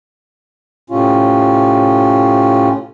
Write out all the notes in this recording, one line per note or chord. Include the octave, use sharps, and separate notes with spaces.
A2 C3 C#4 F4